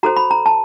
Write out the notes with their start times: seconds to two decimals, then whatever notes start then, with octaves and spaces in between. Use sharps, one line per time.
0.03 F#4 A4 C5 A#5
0.17 B5
0.31 A#5
0.46 A5